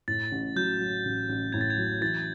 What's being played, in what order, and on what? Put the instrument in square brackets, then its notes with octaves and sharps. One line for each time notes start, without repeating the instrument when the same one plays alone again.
[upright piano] A2 [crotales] A6
[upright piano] A1
[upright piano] F#3 [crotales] G6
[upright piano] F#3
A1
A1
[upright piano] A2 [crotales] G#6
[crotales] A6
G#6
[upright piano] F#3
[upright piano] E3 [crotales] A6